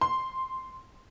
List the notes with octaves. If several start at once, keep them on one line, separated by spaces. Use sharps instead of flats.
C6